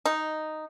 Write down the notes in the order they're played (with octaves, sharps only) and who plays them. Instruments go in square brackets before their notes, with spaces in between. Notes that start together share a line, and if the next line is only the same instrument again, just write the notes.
[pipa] D#4